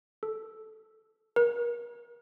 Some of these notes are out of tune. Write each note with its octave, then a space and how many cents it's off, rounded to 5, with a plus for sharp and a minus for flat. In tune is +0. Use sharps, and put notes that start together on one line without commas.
A4 -10
A#4 +35